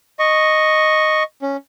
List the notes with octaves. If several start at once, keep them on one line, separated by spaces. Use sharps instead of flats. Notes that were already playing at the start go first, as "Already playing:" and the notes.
D#5 C#6
C#4